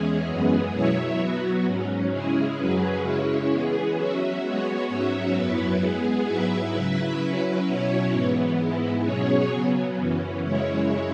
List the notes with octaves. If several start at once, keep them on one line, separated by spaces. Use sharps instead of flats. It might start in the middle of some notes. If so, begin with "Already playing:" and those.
Already playing: E2 E3 G#3 C#4 G#4
F#2 E3 G#3 B3 G#4
B2 F#3 E4 C#5 E5
F#3 B3 F#4
G#2 F#3 C#4
C#3 G#3 C#4 E4 G#4
F#2 F#3 C#4 G#4 B4
C#3 G#3 C#4 E4 C#5
E3 G#3 B3 G#4
F#3 C#4 F#4 E5
G#3 B3 F#4 C#5
G#2 F#3 C#4 F#4 E5
F#2 F#3 B3 E4 B4
G#3 B3 G#4
G#2 F#3 E4 B4 E5
C#3 F#3 E4 B4 E5
F#3 C#4 E4 B4
B2 F#3 C#4 E4 C#5
G#2 E3 B3
G#2 G#3 B3 E4
B2 F#3 C#4 G#4 C#5
C#3 F#3 B3
F#2 E3 C#4
F#2 C#3 G#3 E4 C#5